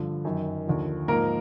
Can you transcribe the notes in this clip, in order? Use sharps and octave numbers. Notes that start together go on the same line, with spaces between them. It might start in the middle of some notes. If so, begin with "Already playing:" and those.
Already playing: G2 D3 F3
F#2 D#3
D#2 D3 F3
G#2 F3 A#3 A#4